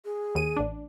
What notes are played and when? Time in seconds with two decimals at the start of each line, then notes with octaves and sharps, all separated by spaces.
0.05 G#4
0.35 D#2 D#7
0.57 A1 D4